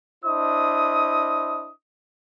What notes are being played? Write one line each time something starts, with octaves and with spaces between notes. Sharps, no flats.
D4 E4 C5 D#5 D#6